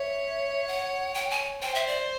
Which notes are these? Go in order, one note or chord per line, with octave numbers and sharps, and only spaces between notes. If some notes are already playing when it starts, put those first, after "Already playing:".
Already playing: C#5 E5
F#5
G5
G#5
C5 G5
E5
D5